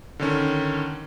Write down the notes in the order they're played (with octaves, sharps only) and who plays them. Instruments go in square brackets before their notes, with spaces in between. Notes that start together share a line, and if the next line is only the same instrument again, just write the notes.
[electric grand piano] D3 D#3 C#4